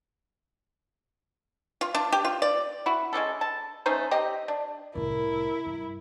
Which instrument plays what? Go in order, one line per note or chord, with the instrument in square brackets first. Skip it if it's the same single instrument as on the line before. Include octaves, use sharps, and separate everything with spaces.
[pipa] F4
D4
G4
F4
D5
E4 F#4
G#3 C#4 D4 A4
A5
A3 C#4 D#4 C5
C4 G4 D#5
D4
[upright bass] C2 A2 [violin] E4 [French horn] A#4
[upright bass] G2